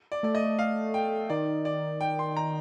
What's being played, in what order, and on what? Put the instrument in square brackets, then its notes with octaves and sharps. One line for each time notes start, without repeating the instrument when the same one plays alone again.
[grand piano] D5
[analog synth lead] A3 [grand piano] D5
[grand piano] D#5
F5
G5
[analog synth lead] D#3 [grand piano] D5
[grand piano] D5
G5
C6
A#5